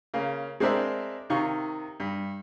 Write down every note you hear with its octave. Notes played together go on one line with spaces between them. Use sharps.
C#3 A#3
G#3 C4 D4 A#4 E5
C3 D#3 F5 C#6
G2